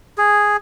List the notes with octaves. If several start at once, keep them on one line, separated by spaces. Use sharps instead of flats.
G#4